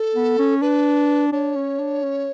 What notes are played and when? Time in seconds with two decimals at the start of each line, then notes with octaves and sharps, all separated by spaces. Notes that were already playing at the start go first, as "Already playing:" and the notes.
Already playing: A4
0.15 B3
0.39 C#4
0.62 D4 B4
1.32 D4 C#5
1.56 C#4
1.79 D4
2.03 C#4